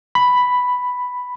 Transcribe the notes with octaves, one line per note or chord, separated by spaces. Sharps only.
B5